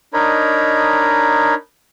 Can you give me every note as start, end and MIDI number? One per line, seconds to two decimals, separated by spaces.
0.14 1.54 62
0.14 1.54 63
0.14 1.54 70
0.14 1.54 73
0.14 1.54 75
0.14 1.54 83